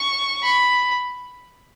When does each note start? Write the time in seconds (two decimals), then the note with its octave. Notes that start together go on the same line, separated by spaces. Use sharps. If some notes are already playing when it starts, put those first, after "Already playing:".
Already playing: C#6
0.43 B5